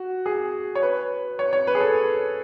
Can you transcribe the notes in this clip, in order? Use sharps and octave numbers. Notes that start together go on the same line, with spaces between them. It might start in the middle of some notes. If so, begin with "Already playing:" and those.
Already playing: F#4
G#4
C#5
B4
C#5
C#5
B4
G#4
A4